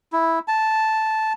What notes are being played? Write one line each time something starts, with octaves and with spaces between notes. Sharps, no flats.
E4
A5